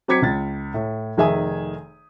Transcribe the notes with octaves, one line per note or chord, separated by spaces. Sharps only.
F#3 C4 D6 G#6 B6 C#7
C#2 A6
A2
F1 D#3 G#4 E5 G#5 D#6